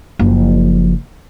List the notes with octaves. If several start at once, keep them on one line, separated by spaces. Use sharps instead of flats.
F#1 F3